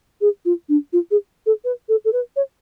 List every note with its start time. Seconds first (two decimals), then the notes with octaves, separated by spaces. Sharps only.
0.21 G#4
0.45 F4
0.69 D4
0.93 F4
1.11 G#4
1.46 A4
1.64 B4
1.89 A4
2.05 A4
2.13 B4
2.36 C#5